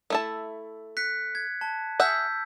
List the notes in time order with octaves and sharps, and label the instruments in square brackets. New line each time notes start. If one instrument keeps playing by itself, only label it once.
[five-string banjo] A3 E4 A5
[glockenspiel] F#6 B6 C#7
G#6
A5
[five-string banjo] G#4 E5 F#5 [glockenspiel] E6 G6 B6